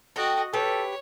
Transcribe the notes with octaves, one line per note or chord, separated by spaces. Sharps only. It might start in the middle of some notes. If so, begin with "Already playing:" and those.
F#4 A4 D#5 G5
G4 A4 B4 C#5